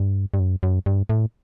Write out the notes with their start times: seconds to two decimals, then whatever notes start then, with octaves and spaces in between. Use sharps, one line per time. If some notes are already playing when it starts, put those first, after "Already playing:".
Already playing: G2
0.34 G2
0.40 F#2
0.63 F#2
0.86 G2
1.09 A2